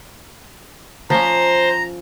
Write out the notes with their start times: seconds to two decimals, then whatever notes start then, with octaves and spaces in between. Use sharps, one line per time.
1.10 F3 C#4 C5 A#5